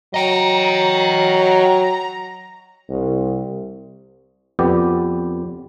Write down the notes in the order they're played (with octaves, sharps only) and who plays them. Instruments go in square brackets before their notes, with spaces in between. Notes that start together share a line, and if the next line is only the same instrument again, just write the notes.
[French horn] F#3 [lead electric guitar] D#5 G5 [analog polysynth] A#5
[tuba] C2
[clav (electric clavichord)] F2 B3 G4 D5